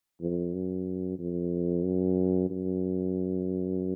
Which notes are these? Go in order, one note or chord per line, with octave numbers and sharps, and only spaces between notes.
F2
F#2
F2
F#2
F#2